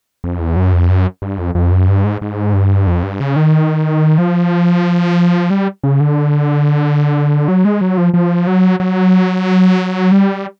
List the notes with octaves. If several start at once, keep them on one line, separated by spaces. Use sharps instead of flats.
F2
E2
F#2
F2
F#2
G2
F2
F2
F#2
G2
G#2
G#2
G2
F2
G2
C#3
D#3
F3
G3
C#3
D3
F#3
G#3
F#3
F3
F3
F#3
F#3
G3